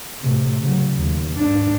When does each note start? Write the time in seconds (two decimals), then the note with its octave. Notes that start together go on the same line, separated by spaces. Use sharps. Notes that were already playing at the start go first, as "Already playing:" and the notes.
0.22 A2 C3
0.60 C#3 F#3
0.95 D#2
1.37 G#2 D4